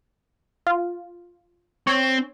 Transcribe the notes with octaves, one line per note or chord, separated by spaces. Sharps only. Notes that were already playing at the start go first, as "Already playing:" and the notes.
F4
C4 C#5